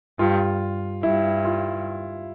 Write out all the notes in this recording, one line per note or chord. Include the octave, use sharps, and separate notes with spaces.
G2 F4
G2 E4
F4